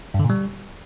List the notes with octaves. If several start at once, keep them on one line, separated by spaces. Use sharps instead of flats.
G2
D3
A#2
G3